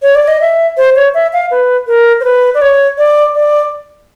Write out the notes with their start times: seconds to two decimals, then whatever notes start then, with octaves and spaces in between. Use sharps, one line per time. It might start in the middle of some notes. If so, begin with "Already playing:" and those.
0.02 C#5
0.15 D5
0.28 D#5
0.41 E5
0.77 C5
0.96 C#5
1.14 E5
1.33 F5
1.51 B4
1.87 A#4
2.20 C5
2.24 B4
2.54 D5
2.62 C#5
2.98 D5
3.35 D5